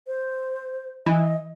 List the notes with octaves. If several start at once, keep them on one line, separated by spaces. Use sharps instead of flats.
C5
E3 D#5